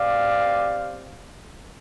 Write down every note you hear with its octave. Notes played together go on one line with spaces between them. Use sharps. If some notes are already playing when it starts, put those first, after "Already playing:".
Already playing: C4 G4 D5 F5